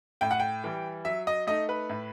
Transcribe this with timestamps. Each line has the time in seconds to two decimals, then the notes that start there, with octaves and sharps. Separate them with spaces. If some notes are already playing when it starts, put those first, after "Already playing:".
0.21 A2 G5
0.31 F#5
0.40 G5
0.64 E3 G3
1.05 F#3 E5
1.27 D#5
1.47 A3 D#4 D#5
1.69 B4
1.90 A2